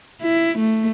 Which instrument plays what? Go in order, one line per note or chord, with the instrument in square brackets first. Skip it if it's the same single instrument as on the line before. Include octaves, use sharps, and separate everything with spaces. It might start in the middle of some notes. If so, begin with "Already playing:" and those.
[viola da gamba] E4
A3